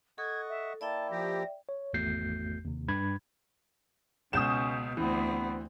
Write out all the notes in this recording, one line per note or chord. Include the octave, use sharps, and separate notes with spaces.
A4 D#5 F#5 C#6 G#6
E5
A#3 E4 D5 E5 G5 A5
F3 G4 A#6
C#5
G#1 E2 A3 F#4 G6 C7
D#2 C3
G2 B5 G#6
C#2 B2 C#4 D#6 G6 E7
D2 E3 B3 C4